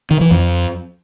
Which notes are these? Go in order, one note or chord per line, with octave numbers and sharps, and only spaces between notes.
D#3
E3
F2